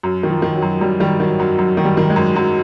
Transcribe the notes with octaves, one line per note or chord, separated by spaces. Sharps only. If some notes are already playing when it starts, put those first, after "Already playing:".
F#2
D#3
F3
D#3
F#3
F#2
F#2 G3
D#3 G3
D#3 F#3
F#2 F#3
F#2 F#3
D#3
G3
D#3
G#3
F#2
F#2 F#3